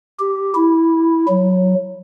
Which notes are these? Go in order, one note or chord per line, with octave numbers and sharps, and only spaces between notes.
G4
E4
F#3